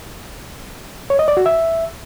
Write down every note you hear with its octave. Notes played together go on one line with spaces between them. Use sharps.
C#5
D#5
D5
F#4
E5